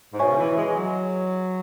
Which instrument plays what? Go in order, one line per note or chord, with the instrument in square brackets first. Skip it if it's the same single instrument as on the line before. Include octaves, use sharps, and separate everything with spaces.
[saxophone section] G#2
[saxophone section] B2 [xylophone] C#5 E5 G#5 C#6
[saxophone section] C#3
E3
G#3
F#3